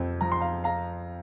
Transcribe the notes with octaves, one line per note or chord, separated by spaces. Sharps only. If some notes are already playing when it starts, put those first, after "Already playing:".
Already playing: F2 C3 C5
F3 A#5
C6
F5 A#5
F5 A#5